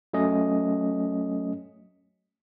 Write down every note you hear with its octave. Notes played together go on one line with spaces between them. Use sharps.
F#3 A3 C#4 D#5